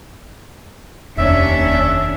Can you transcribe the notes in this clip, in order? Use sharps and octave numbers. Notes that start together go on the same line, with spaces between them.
F1 D#2 C#4 D4 E5